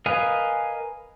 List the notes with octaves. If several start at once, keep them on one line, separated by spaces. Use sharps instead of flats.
A#4 B4 D#5 F5 G#5